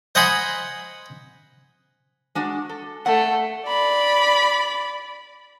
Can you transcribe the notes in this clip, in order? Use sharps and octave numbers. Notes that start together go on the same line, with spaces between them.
C5 D#5 F#5 G#5 B5 C6
G#3 D4 F#4
A4
A3 F#5
D5 B5